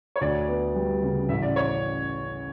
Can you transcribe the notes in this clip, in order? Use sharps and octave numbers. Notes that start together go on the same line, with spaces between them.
C#5
D2 D5
B3
G3
C#3
A1 E5
D5
C#5